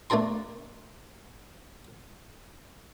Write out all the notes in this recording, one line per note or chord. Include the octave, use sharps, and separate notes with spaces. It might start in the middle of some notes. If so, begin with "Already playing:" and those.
A3 D4 A4 A#4 C6